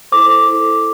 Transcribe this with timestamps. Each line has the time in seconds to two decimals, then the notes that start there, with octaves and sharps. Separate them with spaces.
0.12 E4 A4 C5 D6
0.47 E4 A4 C5